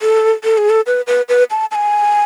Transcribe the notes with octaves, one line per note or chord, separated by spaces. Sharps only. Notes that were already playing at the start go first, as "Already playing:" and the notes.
A4
A4
G#4
A4
B4
B4
B4
A5
A5
G#5